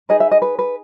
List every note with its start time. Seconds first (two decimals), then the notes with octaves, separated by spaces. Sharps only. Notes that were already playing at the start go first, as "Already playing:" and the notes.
0.09 D#4 G#4 B4 D#5
0.20 E5
0.31 D#5
0.42 B4
0.59 B4